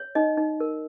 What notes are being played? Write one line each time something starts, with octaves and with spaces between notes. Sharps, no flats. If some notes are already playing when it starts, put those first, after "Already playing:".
Already playing: C#5
D#4 D#5
D#4
A#4